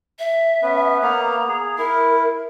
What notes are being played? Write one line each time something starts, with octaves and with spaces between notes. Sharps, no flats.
E5
B3 C#4 B4
A#3 B3 A#5
G#4
E4 A#4